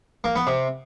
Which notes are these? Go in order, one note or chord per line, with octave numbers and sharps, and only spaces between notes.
A#3
B3
C3